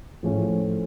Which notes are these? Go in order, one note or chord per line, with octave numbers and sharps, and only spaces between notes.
A2 F3 A3 C#4